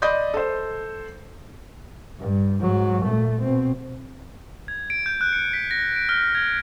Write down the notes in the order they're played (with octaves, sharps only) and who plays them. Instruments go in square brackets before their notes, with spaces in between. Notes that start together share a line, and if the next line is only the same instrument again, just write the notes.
[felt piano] D5 D#5 B5 C6 D#6 G6
A4 C5
[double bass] G2
G#2 F#3
A#2 A3
B2 C4
[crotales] G#6
D7
G6
F#6
C#7
B6
A#6
D7
F6
G#6